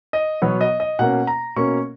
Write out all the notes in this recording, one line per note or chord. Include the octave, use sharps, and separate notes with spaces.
D#5
B2 F#3 B3 C#5
D#5
D#5
B2 A#3 C#4 F#5
A#5
B2 A#3 C#4 C#6